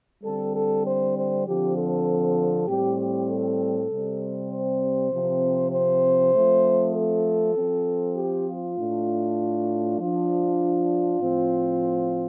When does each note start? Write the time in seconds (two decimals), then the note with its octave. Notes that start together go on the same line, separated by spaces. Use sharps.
0.23 D3 G3 C4 A4
0.54 A4
0.85 C5
1.16 C5
1.45 D3 F3 C4 G4
1.76 A4
2.67 A2 G3 C4 G4
2.97 G4
3.28 A4
3.89 C3 G3 C4
4.50 C5
5.11 C3 F3 C4
5.71 C5
6.32 F3 A3 C4
6.93 A4
7.54 F3 C4
8.14 G4
8.45 F4
8.76 A2 A3 D4
9.97 F3 D4 F4
11.19 A2 F3 C4